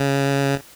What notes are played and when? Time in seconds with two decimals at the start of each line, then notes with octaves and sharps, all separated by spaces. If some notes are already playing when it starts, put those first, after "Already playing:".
Already playing: C#3